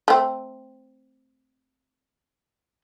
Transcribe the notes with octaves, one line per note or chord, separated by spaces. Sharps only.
A3 C4